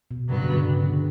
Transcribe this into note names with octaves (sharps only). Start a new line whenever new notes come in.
B2
G2 C#3 F#3 B3
D3
C#3
C#3
D3